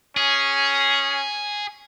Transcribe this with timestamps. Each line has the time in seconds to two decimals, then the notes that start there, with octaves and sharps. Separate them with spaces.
0.17 C#4 G#4